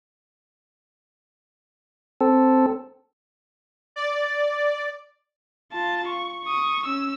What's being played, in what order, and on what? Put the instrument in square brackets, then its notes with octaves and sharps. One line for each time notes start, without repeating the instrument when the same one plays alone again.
[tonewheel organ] C4 A4
[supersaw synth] D5
[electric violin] F4 A5
C#6
C#6 D#6
C#4 E6